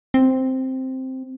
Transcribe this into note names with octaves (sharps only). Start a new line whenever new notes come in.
C4